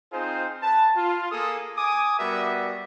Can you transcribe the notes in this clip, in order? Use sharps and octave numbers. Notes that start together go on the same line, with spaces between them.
C4 D#4 F4 G#4 C5
B4 A5
F4
A#3 G#4 A4 D#6
G#5 D6 D#6
G3 B3 F#4 A#4 D5 E5